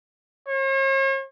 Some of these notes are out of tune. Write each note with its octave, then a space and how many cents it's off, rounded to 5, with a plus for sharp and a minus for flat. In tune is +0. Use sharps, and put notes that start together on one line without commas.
C#5 -45